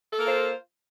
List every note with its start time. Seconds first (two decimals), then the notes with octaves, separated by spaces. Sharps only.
0.13 A4
0.17 A#3
0.20 A#4
0.24 F4
0.28 C5